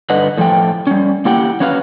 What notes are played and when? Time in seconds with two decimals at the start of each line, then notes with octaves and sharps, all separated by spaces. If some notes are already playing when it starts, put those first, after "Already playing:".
0.10 G2 D3 B4 D#5 F#5
0.38 A2 F3 A3 G5
0.87 G3 C#4
1.25 A#3 E4 G4 F#5 G5
1.60 F#3 C#4 F#4 B4 F5